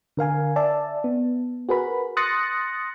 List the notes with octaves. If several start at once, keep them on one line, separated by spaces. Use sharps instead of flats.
D3 A#4 F5 G#5
D5 E5 A5
B3
F#4 G#4 A#4 B4 B5
C6 D#6 F#6 A6 A#6 C#7